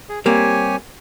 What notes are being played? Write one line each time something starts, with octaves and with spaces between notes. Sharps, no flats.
G#4
G3 A#3 C4 G4 C#5 G#5